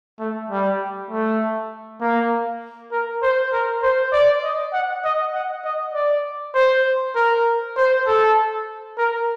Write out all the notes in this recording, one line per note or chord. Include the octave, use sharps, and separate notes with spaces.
A3
G3
A3
A#3
A#4
C5
A#4
C5
D5
D#5
F#5
D#5
F#5
D#5
D5
C5
A#4
C5
A4
A#4